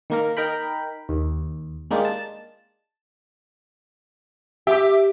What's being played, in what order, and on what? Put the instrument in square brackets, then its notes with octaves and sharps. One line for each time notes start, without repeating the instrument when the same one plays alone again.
[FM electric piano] D#3 A#3 A#4
D#4 A#4 G5 B5
D#2
G#3 A#3 D4 D#4 F4 G4
A5
[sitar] G4 [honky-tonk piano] E5 D6